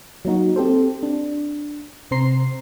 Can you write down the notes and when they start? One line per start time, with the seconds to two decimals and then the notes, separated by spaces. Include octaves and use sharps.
0.25 F#3 A#3 D#4 F#4
0.56 C4 G4 A4 C5
1.03 D4
2.11 C3 C4 C5 A#5 C6 C7